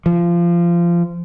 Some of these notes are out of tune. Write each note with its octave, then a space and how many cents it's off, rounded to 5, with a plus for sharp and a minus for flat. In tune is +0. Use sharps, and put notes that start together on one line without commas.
F3 -20